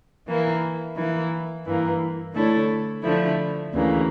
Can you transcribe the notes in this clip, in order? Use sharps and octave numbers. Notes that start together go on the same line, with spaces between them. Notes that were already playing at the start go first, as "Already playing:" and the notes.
E3 A#3 E4
E3 A#3 E4
G2 E3 A#3
D3 A3 E4 A4 C#5
D3 F3 A3 E4
D2 C#3 E3 A#3